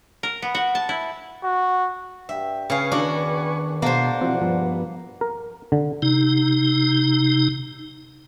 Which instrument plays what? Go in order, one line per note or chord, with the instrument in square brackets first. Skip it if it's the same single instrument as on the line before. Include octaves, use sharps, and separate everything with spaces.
[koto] A#4
B3
F#4
A5
E4
[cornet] F#4
[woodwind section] G2 G5 [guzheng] E5
[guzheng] C#3 F5 [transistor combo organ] B4 G#5 C#6
[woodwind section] E2 D#3 [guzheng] D4 F#4
[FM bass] B2 [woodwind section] G#3 D4 F#5 [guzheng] A#3 C5 [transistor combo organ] A5
[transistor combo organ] E3 F3 F#4 [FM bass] C4
[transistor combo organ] G2 B3 [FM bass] F3
[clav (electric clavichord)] A#4
D3
[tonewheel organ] C3 D#4